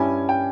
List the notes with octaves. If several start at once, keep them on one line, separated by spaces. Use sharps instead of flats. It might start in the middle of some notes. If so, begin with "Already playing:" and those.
Already playing: G2 G3 C#4 E4 G#5
G5